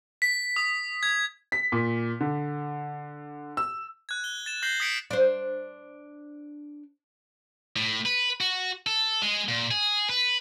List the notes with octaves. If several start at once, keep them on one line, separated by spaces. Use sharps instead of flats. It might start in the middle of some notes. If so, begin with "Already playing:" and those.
B6
D#6
G#6
B6
A#2
D3
E6
F#6 G#6
G7
A6 E7
F#6 G6 A#6 C7 F#7 G7
D#6 G#6 B6 C#7 D7
D4 C5
A2
B4
F#4
A4
G#3
A#2
G#4
B4